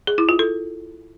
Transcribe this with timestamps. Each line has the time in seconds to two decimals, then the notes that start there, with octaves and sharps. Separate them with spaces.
0.07 G#4
0.18 E4
0.29 F4
0.39 A4